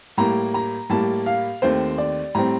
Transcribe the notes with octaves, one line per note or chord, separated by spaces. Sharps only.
A2 G3 A#3 A#5
A#5
A2 G3 A#3 A5
F5
D#2 D#3 A3 C4 C5
D5
A2 G3 C4 A#5